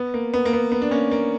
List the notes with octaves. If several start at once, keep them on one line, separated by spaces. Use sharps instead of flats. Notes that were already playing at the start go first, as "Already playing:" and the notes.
Already playing: B3
A#3
B3
A#3
B3
B3
D4
A#3 C#4
A#3